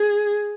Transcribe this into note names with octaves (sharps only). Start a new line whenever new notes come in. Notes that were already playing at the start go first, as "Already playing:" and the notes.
Already playing: G#4